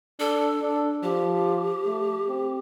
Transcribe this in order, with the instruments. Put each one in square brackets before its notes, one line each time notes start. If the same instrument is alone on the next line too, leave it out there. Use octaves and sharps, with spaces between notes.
[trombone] D4 [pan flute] A4
[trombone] D4
[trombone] F3 [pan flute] G4
[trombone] A3
C4